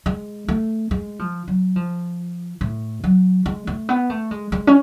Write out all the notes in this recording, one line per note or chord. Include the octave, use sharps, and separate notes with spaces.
G#3
A3
G#3
F3
F#3
F3
A2
F#3
G#3
A3
B3
A3
G#3
G#3
C#4